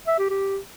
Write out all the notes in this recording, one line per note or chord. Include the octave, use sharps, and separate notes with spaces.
E5
G4
G4